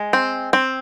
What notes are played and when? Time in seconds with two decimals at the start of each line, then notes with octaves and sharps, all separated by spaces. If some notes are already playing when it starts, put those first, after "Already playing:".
Already playing: G#3
0.13 C4
0.53 C4